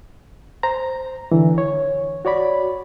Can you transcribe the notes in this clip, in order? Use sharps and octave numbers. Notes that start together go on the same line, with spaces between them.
C5 A#5
D3 E3
C#5
F#4 C#5 D5 B5